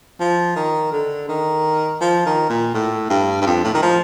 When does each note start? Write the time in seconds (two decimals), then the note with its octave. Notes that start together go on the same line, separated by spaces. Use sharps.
0.20 F3
0.56 D#3
0.92 D3
1.29 D#3
2.01 F3
2.25 D#3
2.49 A#2
2.74 A2
3.10 G2
3.41 G2
3.46 F2
3.64 A2
3.74 D#3
3.82 F3